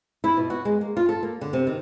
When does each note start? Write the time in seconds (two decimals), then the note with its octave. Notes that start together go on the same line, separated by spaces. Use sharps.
0.24 E4
0.37 B2
0.50 F#4
0.65 G#3
0.81 A#3
0.97 F4
1.09 A4
1.23 A#3
1.41 D3
1.53 C3
1.67 D#3